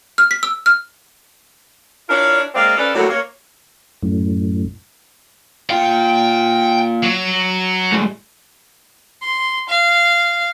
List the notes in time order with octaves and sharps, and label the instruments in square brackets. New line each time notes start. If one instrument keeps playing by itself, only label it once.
[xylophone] F6
B6
E6
F6
[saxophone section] D4 E4 F4 A#4 C#5 D5
G#3 A#3 C4 D5 F5
C#4 F4 A4 B4 C5 D5
A2 C3 F#3 G3 A#3 F#4
A#3 C#5
[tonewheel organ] F#2 A2
[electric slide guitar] A#3 F4 F5 [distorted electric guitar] G5
[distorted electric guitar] F#3
[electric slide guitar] A2 G3 G#3
[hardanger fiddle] C6
F5